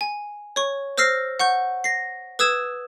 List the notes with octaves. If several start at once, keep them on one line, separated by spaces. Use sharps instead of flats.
G#5
C#5 C#6
C5 E6 F6 A#6 C7
F#5 C#6 G6
A#6 C7
B4 D#6 E6 G#6 E7